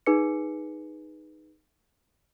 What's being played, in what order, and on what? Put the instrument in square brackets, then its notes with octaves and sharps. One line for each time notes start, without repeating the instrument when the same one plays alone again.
[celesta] D#4 G#4 B4 C#7